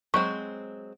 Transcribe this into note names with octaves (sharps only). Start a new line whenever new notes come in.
F#3 G#3 C4 C#6